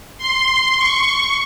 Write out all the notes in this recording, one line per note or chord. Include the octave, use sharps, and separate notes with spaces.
C6
C#6